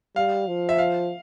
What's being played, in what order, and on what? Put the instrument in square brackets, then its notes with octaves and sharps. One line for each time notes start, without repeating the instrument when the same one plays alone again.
[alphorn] G3 [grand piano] F5
[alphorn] F3
[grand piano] E5
F5